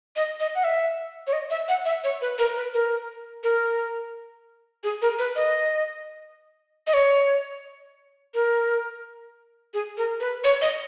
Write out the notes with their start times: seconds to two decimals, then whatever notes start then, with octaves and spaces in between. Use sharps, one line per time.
0.16 D#5
0.40 D#5
0.55 F#5
0.64 E5
1.27 C#5
1.33 D#5
1.50 E5
1.68 F#5
1.85 E5
2.04 C#5
2.22 B4
2.38 A#4
2.56 B4
2.74 A#4
3.43 A#4
4.84 G#4
5.02 A#4
5.19 B4
5.36 D#5
6.87 D#5
6.94 C#5
8.34 A#4
9.74 G#4
9.97 A#4
10.20 B4
10.44 C#5
10.61 D#5